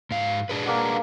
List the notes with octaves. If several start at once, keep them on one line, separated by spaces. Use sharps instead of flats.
G#2 F5
D4 G#4 B4
A#3 D5 F#5